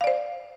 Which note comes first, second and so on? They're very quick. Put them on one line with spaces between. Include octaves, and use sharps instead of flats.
F5 D5 C5